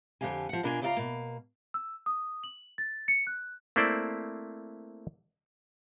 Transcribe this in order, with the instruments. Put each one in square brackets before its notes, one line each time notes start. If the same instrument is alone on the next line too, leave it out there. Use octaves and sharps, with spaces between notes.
[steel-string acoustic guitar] F2 D3 F3 G4 F5 G#5
F3 F#5
B2 A#3 D4 F4 G#4 G#5
C#3 F4 D5 D#5 F5 A#5
B2 A#3
[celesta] E6
D#6
F#7
A6
C#7
F#6
[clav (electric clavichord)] A3 A#3 C4 E4 C5 D5